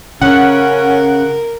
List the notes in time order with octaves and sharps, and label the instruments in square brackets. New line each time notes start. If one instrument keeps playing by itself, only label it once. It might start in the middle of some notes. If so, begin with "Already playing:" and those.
[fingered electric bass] C#3 [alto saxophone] C#4 [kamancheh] A#4 [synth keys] F#5